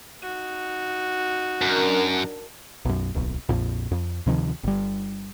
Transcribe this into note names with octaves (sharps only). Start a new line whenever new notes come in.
D#4 F#4
F#2 D4 A#4
B1 F#2
D1 B1
A#1 F2 A#2
F2
D2 C3 D#3 F3
G1 G3